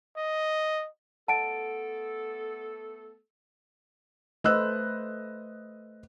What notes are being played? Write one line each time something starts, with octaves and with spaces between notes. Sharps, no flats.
D#5
A3 B3 A4 D#5 F#5 A5 D7
A3 B4 C5 D#5 E6 F#6